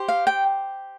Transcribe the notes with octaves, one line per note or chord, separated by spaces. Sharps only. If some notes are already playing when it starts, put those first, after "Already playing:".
Already playing: G4 C5
F5
G5